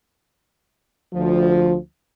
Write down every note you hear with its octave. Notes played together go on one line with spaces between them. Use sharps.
D2 F3